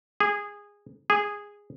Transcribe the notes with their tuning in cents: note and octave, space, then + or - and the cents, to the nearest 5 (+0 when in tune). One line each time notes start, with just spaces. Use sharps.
G#4 -15
G#4 -10